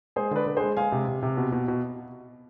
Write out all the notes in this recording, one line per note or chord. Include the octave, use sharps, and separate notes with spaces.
G#3 G#4 C5
D3 B4 D5
D3 B4
G#3 G#4 C5
G#3 F5 G#5
C3
C3
C3
B2
B2
B2